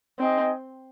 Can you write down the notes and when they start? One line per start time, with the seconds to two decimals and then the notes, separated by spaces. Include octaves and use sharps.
0.19 C4 D#4 G#4 D#5 G5